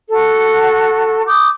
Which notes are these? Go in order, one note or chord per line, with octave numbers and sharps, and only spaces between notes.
F#4 A4
D6 D#6 G6